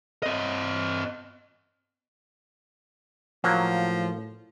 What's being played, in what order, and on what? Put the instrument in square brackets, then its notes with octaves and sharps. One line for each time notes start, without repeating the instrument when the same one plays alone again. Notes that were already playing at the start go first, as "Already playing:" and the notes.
[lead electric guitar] C4 D#5
[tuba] A2 [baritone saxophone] F3 [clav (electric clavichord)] F#3 A#3